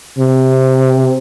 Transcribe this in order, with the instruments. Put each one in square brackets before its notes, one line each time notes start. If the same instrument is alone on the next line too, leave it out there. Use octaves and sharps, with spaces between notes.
[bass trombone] C3